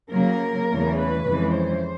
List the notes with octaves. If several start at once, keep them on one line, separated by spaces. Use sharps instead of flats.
C#3 F#3 A#3 A#4
E2 C#3 E3 A3
B4
F2 C#3 E3 G#3
C5